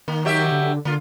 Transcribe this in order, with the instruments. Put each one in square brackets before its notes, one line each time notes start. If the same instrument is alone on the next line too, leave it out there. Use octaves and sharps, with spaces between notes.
[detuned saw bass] D#3 [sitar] A#3
[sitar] F#3 G4 E5
[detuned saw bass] D3
[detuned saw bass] D3 [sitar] A#3 F4